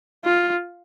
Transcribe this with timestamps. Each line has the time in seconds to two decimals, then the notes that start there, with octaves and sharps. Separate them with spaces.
0.25 F4